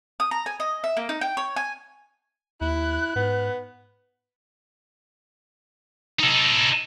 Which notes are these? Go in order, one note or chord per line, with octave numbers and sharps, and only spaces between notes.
D#6
A#5
G#5
D#5
E5
A#3
D#4
G5
C#5
G#5
D#2 E4 F#6
G#2 B3
D#4 A4